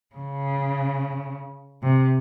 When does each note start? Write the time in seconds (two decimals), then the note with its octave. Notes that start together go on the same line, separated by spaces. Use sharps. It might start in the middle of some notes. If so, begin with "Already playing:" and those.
0.15 C#3
1.83 C3